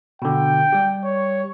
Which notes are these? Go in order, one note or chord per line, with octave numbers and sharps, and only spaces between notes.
B2 D3 G5
G3 G4
C#5